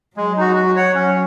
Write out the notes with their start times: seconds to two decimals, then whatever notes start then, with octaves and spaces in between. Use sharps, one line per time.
0.16 F#3 G#3
0.37 D#4 F#4
0.56 F#4
0.76 C#5 F#5
0.95 F#3 C#4